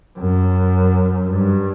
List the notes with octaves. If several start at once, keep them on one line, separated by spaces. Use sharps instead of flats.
F#2
G2